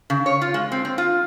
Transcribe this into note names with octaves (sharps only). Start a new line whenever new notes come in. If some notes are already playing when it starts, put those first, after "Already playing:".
C#3
C#5
F4
G#3
C4
C4
F4